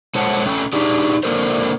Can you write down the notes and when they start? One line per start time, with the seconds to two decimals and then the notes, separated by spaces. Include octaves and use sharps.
0.15 G#3 A4 C5 C#5 F#5 A5
0.45 A3 C#4 A4 G5
0.73 D4 D#4 G4 G#4
1.23 A#3 D4 A4 A#4 C5